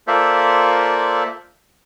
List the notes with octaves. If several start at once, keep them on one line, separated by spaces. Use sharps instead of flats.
A#3 F4 A4 C5 D5 E5